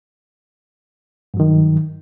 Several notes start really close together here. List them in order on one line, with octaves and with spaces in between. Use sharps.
G2 F#3 D#3